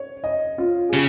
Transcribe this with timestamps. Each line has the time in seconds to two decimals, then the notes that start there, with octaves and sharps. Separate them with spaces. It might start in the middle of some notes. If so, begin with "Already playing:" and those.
Already playing: C#5
0.24 D#5
0.58 F4
0.89 G#4
0.93 C#3 G4